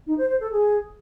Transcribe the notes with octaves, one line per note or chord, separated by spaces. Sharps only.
D#4
C5
C5
A4
G#4